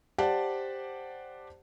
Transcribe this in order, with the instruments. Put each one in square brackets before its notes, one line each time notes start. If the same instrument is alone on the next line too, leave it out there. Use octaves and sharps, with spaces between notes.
[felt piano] G4 C5 D5 F#5 A5